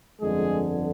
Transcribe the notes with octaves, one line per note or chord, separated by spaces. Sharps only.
G1 F2 D3 G#3 G#4